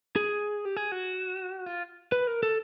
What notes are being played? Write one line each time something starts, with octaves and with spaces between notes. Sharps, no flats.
G#4
G4
G#4
F#4
F4
B4
A#4
A4